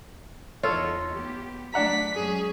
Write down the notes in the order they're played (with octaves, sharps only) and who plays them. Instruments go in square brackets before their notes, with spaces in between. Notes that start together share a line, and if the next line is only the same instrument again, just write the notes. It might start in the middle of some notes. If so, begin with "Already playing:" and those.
[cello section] E2 D#4 [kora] F4 [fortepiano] A4 C#5
[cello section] B3 G4
[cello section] F#2 A3 [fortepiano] D4 F#5 A#5 [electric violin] B6
[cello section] F#2 G#3 C#4 [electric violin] G#4